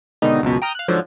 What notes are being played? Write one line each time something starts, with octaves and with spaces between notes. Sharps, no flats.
G#2 B2 D3 D#3 D#4
C#2 F#2 B2
G5 A#5 D#6 F6
F5 F#6
G#2 D3 F3 F#3